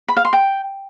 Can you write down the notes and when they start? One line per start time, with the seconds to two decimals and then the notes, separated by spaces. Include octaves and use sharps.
0.08 B5
0.17 F5
0.25 C6
0.33 G5